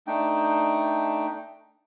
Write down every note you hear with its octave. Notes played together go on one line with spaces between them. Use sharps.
A3 D4 D#4 G5